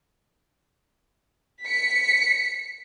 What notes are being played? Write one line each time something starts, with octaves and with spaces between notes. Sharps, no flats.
B6 C#7